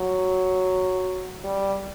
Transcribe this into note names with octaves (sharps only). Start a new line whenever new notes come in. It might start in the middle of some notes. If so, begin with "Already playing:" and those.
Already playing: F#3
G3